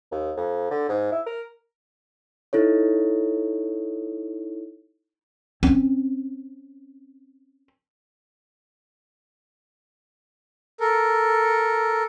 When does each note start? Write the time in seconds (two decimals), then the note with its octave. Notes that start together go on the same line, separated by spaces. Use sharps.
0.12 D#2
0.37 F2
0.71 D3
0.89 G#2
1.12 E4
1.26 A#4
2.53 D#4 E4 A4 C#5
5.63 C4 C#4
10.80 A4 A#4